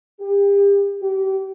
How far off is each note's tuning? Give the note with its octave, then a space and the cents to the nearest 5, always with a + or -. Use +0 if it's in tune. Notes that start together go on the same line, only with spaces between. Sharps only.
G4 +35
G4 -30